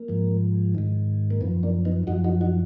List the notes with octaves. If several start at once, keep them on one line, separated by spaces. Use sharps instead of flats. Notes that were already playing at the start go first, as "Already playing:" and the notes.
Already playing: A#3
G#2 F3
G#2 D#3
A#3
F#2 F3 B3
A#3 D4
B3 D#4
F#2 F3 D#4 F#4
D#4 F#4
D#4 F#4